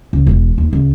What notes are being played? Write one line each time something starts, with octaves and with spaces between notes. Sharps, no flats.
C#2
E1
D#2
C#2